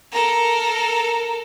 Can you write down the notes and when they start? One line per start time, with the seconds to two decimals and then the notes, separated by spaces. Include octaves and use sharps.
0.11 A4 A#4